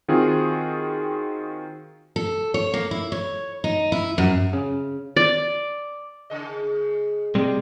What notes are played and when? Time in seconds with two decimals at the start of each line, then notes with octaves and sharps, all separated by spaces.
0.08 D#3 C4 F4 F#4 G#4
2.16 A4
2.54 C#5
2.74 A#3
2.91 E4
3.12 C#5
3.64 D#4
3.92 E4
4.18 F#2
4.53 C#3
5.17 D5
6.30 C#3 G#4 D#5
7.35 C3 G3 G#3